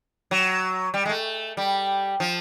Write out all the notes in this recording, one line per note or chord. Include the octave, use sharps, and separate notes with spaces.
F#3
G3
G#3
A3
G3
F3